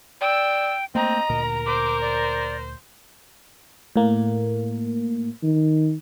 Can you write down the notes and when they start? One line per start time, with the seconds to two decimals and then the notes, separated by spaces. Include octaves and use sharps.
0.21 D5 G5 E6
0.95 A3 A#3 C4 D#5 A#5
1.30 D2 A#2 A#4
1.66 C5 D6
2.01 D5
3.96 A2 A#3
5.43 D#3